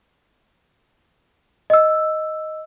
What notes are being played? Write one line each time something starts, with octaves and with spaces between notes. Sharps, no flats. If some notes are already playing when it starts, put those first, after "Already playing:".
D#5 E6